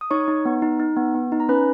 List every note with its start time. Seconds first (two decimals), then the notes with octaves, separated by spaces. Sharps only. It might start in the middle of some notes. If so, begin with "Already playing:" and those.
0.01 D#6
0.11 D#4 C#5 C#6
0.28 D#4
0.45 B3
0.62 D#4
0.79 D#4
0.96 B3
1.15 B3
1.32 D#4
1.40 A#5
1.49 C#4 B4 B5